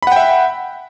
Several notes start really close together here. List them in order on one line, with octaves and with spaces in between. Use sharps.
B5 F#5 G5 E5